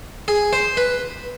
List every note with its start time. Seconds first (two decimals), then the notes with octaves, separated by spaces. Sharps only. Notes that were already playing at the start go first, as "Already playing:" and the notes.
0.28 G#4
0.53 C5
0.77 B4